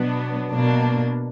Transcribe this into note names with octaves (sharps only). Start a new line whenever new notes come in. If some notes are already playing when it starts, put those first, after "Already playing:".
Already playing: B2 F#3 B3 D4
B2 A#3 D4